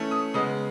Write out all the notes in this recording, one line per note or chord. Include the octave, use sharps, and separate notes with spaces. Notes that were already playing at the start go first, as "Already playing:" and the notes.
Already playing: E3 A3 C#4
D#6
C#3 G#3 B3 D#6